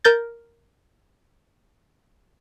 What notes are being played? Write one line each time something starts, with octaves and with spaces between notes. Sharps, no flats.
A#4 G6 A6